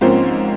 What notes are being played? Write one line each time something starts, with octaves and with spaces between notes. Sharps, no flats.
G#2 F3 A#3 C4 C#4 C5